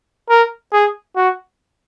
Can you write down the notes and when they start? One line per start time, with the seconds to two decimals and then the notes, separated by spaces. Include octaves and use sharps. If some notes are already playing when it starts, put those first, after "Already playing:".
0.30 A#4
0.73 G#4
1.16 F#4